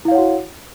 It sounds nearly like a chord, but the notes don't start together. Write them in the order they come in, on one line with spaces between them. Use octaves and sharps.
E4 F5 C#5 F#5 F#4